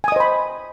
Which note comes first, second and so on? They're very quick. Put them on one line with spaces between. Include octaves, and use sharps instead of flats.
G#5 D#6 D#5 C5 B5